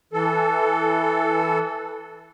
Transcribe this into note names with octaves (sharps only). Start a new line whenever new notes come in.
E3 A4